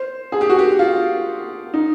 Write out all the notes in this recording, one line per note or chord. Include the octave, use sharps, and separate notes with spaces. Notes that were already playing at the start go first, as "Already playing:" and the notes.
Already playing: C5
G#4
G4
F#4
G4
F4
D#4